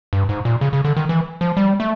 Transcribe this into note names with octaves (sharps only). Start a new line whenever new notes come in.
G2
G#2
A#2
C#3
C#3
D3
D#3
E3
F3
G3
A3